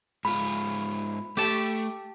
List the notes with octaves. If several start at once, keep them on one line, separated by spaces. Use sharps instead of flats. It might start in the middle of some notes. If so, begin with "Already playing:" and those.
G#2 F4 B5
A3 G4 A5